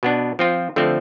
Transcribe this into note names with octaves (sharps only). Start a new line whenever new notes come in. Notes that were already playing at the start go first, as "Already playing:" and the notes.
B2 B3 D4
F3 C4 F4
D3 F3 A3 C4